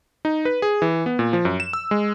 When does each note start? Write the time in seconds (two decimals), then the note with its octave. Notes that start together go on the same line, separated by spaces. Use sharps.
0.25 D#4
0.45 B4
0.62 G#4
0.82 E3
1.06 B3
1.19 A#2
1.33 F3
1.45 F#2
1.60 E7
1.73 E6
1.91 G#3